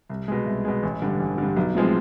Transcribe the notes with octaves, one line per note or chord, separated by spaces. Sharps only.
C2
B2 G#3
C2
B2 G#3
A1
G2 D3
A1
G2 D3
B1
A2 F3 G#3 C4